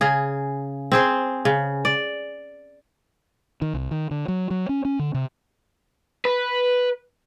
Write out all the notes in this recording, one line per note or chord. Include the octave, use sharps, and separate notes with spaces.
C#3 G#4
C4 G#4 C5
C#3
D5
D#3
C2
D#3
D3
F#3
F#3
C#4
C#4
D3
C3
B4